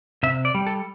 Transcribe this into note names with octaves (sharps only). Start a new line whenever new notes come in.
C3 E5
D5
G3
A4